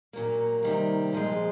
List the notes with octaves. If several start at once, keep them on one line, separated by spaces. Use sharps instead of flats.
A#2 F#3 A#3
C3 D#3 G3 A#3
A#2 F3 G#3